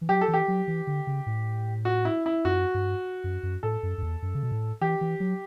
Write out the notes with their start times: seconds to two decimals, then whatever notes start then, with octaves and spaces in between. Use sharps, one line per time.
0.01 E3
0.09 F#3 G4
0.21 A4
0.28 E3
0.34 G4
0.48 F#3
0.68 E3
0.87 D3
1.07 C#3
1.26 A2
1.85 F#4
2.05 E4
2.26 E4
2.45 F#2 F#4
2.74 G2
3.24 F#2
3.43 F#2
3.63 A2 A4
3.83 F#2
3.98 F#2
4.03 E2
4.22 F#2
4.34 C#3
4.43 B2
4.52 A2
4.81 E3 G4
5.01 E3
5.20 F#3